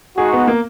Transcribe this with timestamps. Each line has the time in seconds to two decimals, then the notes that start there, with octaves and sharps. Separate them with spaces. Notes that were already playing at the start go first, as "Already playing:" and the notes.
0.17 G#3 D#4 F#4 G#4
0.33 B3
0.48 A#3